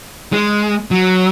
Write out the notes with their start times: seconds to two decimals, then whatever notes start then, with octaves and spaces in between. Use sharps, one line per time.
0.33 G#3
0.91 F#3